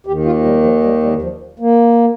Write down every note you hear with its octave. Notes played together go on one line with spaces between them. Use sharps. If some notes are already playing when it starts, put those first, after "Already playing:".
D#2 D#3 G4
F4
G3
F3
G3
G3
F3
A#3